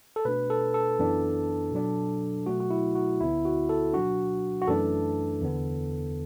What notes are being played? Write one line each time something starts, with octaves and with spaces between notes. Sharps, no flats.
A4
B2 A3 D4 B4
A4
A4
F#2 E3 B3 D4
B2 F#3 D4
B2 F#3 A3 F#4
F#4
E4
F#4
D2 D3 B3 E4
F#4
A4
B2 F#3 D4 F#4
F#4
F#2 E3 A3 D4 A4
E2 D3 B3